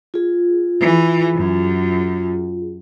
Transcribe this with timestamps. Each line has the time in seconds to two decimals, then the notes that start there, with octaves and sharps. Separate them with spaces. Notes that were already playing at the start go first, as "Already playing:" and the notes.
0.14 F4 G#4
0.80 E3
1.35 F#2